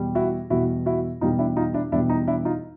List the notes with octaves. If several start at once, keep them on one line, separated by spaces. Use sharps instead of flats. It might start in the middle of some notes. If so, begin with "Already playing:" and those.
Already playing: E2 B2 G3
E4 F#4
E2 B2 G3 E4 F#4
E4 F#4
E2 B2 G3 D#4 F4
D4 E4
D#4 F4
D4 E4
E2 B2 G3 D4 E4
D#4
D4 E4
D#4 F4